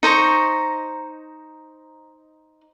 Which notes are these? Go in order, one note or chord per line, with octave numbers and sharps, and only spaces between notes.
D#4 C5 A#5 C#6